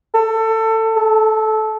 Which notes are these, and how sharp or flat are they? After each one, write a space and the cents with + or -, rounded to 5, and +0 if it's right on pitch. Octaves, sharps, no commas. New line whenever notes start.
A4 +20
A4 -15